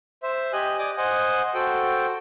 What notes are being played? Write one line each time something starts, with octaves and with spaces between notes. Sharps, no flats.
C5 E5
G4 D#5 G#5 F#6
D5 D#5 G#5 D6 D#6
C5 D#5 F#5 G#5
F#4 A4 C5 G5